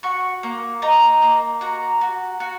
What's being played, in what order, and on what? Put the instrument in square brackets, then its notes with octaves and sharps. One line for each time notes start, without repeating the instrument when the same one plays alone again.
[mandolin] F#4 C#6
A#3
D#4 A#5
A#3
F#4 A#5
F#4
F#4